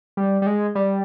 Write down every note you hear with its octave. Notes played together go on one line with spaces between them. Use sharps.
G3
G3
G#3
G3